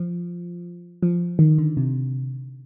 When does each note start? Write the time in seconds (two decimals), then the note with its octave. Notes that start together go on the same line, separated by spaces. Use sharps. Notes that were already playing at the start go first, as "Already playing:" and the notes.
Already playing: F3
1.03 F3
1.39 D#3
1.58 D3
1.77 C3